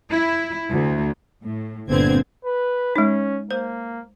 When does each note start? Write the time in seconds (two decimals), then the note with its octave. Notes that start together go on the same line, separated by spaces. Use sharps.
0.10 E4
0.69 D2
1.42 A2
1.89 G1 A#2 D3 B3 C4 G#6
2.45 B4
2.96 G#3 C#4 D#4
3.51 A#3 C5